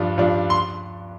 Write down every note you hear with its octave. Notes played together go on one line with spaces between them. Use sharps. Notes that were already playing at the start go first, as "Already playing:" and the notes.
Already playing: G2 F3 D4
G2 F3 D4
C6